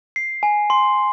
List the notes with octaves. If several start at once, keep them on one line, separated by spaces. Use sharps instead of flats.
C7
G#5
C6